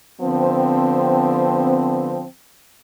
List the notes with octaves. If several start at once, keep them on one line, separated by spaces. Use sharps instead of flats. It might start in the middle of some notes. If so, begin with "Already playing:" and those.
D3 F3 B3 C4